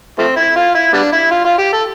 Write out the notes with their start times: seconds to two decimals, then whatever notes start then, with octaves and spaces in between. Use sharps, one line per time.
0.18 F3 A3 C4
0.36 E4
0.56 F4
0.75 E4
0.93 G3 B3 D4
1.12 E4
1.31 F4
1.45 F4
1.58 G4
1.73 A4